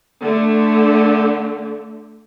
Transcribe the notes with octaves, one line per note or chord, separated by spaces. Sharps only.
D3 A3